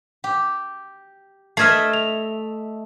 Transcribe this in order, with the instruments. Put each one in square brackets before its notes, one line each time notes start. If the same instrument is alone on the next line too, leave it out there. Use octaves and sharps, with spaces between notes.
[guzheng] G4
[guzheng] A3 D#5 E5 [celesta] F6 G#6 C7
[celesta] F7